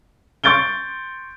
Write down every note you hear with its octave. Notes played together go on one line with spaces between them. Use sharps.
C6 C#6 G6 A6 D7 G7